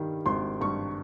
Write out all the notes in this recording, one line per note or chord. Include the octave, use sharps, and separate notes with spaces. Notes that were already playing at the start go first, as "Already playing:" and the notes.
Already playing: G2 D#3 G3
G#1 C6
G2 C#6